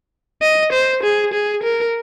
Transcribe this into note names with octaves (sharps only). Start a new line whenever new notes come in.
D#5
C5
G#4
G#4
A#4